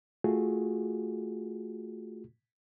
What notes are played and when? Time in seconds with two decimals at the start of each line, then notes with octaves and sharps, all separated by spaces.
0.24 A3 F4 F#4 G#4